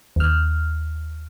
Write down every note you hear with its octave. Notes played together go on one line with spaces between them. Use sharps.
D#2 F6